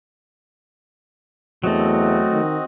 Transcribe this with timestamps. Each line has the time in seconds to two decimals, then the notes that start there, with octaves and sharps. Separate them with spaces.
1.64 E2 F#3 A3 C4 F#4 D#5
2.32 D#3